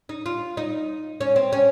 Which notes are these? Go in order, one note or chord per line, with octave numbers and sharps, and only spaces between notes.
D#4
F4
D#4
C#4
C4
C#4